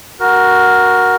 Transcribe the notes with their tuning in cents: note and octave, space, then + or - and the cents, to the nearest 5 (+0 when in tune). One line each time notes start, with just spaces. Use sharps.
F#4 +0 A#4 +10